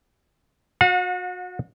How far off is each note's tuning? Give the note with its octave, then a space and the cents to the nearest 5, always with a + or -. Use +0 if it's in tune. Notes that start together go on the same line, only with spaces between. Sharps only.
F#4 -30 F#5 -45